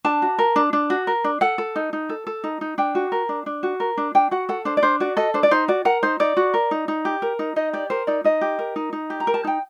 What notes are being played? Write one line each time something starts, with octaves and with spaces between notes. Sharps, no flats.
D4 A5
F#4
A#4
D4
D4
F#4
A#4
D4
A4 F#5
A4
D#4
D#4
A4
A4
D#4
D#4
D4 G5
F#4
A#4
D4
D4
F#4
A#4
D4
D4 G5
F#4 F#5
A4 F#5
D4 C5
D5
D4 C5
F#4 D5
A4 D#5
D4 C5
D5
D#4 C5
F#4 D5
A#4 F#5
D#4 C5
D#4 D5
F#4
A#4
D#4
D#4
G4
A#4
D#4
D#4 D#5
G4 D5
A#4 C5
D#4 D5
D#4 D#5
G4
A#4
D#4
D#4
G4
A#5
A#4
A5
D#4 G5